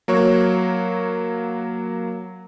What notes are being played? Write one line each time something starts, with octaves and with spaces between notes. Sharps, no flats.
F#3 A#3 F#4 C#5